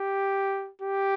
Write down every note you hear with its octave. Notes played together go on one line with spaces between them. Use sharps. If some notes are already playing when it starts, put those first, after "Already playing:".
Already playing: G4
G4